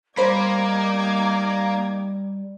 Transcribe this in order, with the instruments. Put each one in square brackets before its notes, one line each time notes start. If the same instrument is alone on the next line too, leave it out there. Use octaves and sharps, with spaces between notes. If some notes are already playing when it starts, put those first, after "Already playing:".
[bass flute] G3 [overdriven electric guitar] A#3 [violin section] D#4 D6 G#6 [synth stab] C5 B5